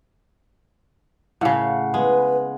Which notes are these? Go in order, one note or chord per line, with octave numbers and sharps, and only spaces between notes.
A2 C#3 F5 F#5
G#3 B3 B4